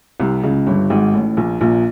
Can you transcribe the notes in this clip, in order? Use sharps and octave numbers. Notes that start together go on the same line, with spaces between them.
C2 C3
C#2 C#3
G1 G2
G#1 G#2
A1 A2
A#1 A#2
A#1 A#2